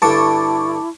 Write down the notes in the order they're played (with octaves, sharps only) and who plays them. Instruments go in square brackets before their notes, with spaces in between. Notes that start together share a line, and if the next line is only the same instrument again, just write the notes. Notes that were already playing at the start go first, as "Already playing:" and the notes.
[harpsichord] G2 D3 [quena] E4 [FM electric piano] A5 C#6 D6